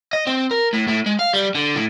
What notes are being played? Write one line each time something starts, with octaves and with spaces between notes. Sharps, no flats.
D#5
C4
A#4
A2
A2
G#3
F5
G3
D3
A2